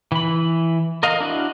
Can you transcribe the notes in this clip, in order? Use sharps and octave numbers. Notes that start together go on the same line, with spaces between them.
E3 B5
A#4 D#5 F5
D4 E4 F#4